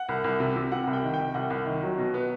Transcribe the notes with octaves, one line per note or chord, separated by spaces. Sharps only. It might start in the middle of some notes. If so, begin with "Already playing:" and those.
Already playing: F#5
C2
C2
C3
C3
C3 F#5
C2
G5
D#3
G5
C3
C2 F#5
C2
D#3
F#3
B2
B3